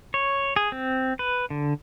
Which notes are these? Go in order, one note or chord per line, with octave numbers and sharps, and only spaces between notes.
C#5
G#4
C4
B4
D3